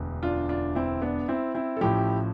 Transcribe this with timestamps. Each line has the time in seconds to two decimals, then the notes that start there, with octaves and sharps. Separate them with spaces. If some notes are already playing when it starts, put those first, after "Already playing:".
Already playing: E1 D2
0.23 D4 F4
0.49 D4 F4
0.75 C4 E4
1.02 B3 D4
1.28 C4 E4
1.55 C4 E4
1.77 A4
1.81 A1 A2 F3 E4 G4